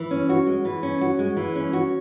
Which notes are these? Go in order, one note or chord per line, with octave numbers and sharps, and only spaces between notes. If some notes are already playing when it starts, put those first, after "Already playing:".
Already playing: E3
C#4
F#4
G#3
E3
C#4
F#4
G#3
E3
C#4
F#4